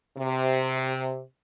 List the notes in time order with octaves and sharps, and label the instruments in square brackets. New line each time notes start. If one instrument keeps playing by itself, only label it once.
[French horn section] C3